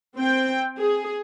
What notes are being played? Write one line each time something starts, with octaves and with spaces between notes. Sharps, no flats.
C4 G5
G#4